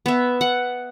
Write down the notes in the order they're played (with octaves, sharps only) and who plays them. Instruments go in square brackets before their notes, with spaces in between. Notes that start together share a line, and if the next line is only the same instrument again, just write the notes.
[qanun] B3 E5
F#5